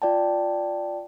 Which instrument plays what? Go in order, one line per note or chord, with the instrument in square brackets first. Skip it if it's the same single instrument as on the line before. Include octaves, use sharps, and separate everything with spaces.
[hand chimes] F4 D5 G5 A5